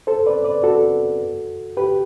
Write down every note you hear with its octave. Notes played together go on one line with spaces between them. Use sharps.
A4 C5
B4 D5
B4 D5
F#4 A4
G4 B4